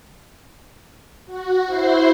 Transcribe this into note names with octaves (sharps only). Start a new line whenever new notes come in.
F#4
E4 C5 C6